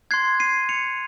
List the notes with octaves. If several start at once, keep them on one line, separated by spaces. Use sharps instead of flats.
C6 F#6 G#6 C7
C7 D#7
C#7 F7